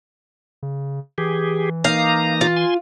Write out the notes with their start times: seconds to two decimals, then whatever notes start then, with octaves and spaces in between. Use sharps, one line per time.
0.63 C#3
1.18 E3 G4 G#4
1.84 A#3 D#4 F5 A#5
2.41 F4
2.56 G#5 C6